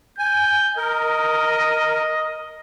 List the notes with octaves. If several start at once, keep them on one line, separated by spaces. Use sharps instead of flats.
G#5 G6
A#4 D#5